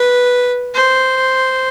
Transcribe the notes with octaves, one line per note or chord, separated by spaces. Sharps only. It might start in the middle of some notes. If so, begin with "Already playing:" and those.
Already playing: B4
C5